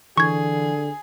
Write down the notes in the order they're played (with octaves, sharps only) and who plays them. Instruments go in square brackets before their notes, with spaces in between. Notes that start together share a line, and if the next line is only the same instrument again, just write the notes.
[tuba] D3 [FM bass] E3 [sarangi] G#4 [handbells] C#6 G#6